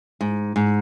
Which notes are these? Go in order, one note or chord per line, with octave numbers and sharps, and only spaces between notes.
G#2
G#2